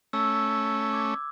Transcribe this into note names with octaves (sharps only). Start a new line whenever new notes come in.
A3 C#4 E6
D6 G#6